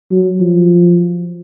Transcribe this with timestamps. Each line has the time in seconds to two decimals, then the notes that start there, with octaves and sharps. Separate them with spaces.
0.11 F#3
0.40 F3